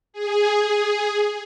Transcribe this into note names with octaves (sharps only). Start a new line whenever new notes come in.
G#4